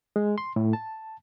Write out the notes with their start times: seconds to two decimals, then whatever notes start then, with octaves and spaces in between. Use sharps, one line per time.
0.16 G#3
0.38 C6
0.56 A2
0.73 A5